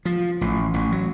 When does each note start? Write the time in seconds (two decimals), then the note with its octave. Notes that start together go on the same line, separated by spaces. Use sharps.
0.05 F3
0.41 A1
0.74 A1
0.92 F#3